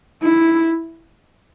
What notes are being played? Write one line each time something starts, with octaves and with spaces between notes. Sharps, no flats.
E4